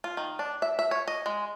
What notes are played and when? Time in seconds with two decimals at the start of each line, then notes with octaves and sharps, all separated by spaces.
0.04 F4
0.17 D#3
0.39 D4
0.62 E5
0.79 E5
0.91 C#5
1.08 D#5
1.26 G#3